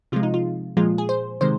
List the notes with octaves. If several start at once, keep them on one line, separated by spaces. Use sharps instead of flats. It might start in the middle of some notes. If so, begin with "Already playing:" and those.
C3 F3 G#3 F4
D#4
F4
A#2 F3 G#3 F4
G#4
C5
C3 D#3 G#3 C5